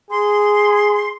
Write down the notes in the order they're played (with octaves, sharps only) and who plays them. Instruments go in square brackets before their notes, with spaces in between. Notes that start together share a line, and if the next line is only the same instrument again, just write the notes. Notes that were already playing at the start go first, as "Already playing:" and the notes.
[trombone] G#4 [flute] C6